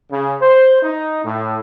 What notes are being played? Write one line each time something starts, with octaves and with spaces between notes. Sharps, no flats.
C#3
C5
D#4
A2